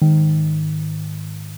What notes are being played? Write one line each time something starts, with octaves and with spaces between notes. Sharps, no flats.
G#2 D#3